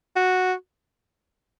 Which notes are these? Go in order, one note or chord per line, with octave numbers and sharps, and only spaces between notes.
F#4